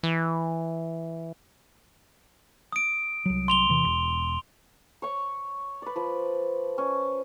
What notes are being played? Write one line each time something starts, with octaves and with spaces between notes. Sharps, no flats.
E3
D#6 D7
C2 F#3
C6 F7 G7
E2 C3 E3
E1
C#5 C#6
B4 D5
F3 B4
C#4